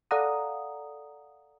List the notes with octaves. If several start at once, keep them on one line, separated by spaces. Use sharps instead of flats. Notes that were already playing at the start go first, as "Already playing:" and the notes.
A4 D5 F5 F#5 A#5 D#6